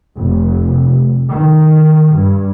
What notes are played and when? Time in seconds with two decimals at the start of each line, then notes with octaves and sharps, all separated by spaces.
0.16 F1
1.33 D#3
2.15 G2